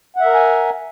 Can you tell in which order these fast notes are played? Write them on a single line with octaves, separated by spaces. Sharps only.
F#5 E5 A#4 A#5 G#5